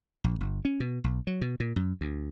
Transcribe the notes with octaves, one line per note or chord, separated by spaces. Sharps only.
A#1
G1
C#4
B2
B1
F#3
B2
A#2
F#2
D2